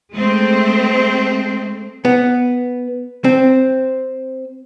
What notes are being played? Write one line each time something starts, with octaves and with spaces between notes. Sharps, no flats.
G#3 A3 C4
B3
C4